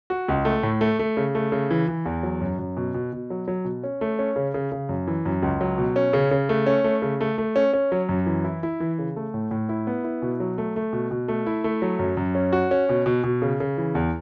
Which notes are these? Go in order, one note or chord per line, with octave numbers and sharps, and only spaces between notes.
F#4
C#2
A3
A2
A3
A3
C#3
A3
C#3
E3
E3
E2
F#3
F#2
F#2
B2
B2
B2
F#3
F#3
B2
C#4
A3
C#4
C#3
C#3
C#3
F#2
E3
F#2
C#2
F#3
B2
C#4
C#3
C#3
A3
C#4
A3
C#3
A3
A3
C#4
C#4
F#3
F#2
E3
E4
E4
E3
C#3
A3
A2
A2
E4
B3
E4
B2
F#3
A3
A3
B2
B2
A3
E4
A3
F#3
F#2
F#2
C#4
F#4
C#4
B2
B2
B2
C#3
C#3
E3
E2